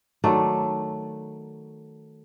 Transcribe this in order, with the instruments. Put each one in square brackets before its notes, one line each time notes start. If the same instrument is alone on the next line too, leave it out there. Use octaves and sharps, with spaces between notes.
[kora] D#3 F#3 A3 D5